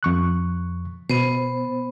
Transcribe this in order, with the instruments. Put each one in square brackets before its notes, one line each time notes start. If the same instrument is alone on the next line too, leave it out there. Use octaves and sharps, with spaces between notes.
[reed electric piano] F2 C#6 F#6
[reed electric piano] B2 [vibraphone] B3 C5